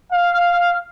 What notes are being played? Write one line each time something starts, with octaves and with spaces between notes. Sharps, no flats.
F5